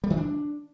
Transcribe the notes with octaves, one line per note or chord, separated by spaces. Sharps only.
G3
D#3
D4